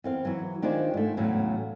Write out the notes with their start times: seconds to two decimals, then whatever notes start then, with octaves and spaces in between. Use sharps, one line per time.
0.04 E2 C4 F5
0.25 E3 F#3
0.62 D#3 D4 F4 G4 C5 G#5
0.94 G#2 A3
1.17 E2 A2 C#3 F#3